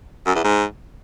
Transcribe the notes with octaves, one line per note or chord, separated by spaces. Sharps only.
F#2
E2
G#2